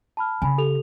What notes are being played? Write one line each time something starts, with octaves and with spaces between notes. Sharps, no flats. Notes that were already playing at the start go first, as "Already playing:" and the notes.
A5 B5 F6
C#3 G#5 B5
G4 A4 F7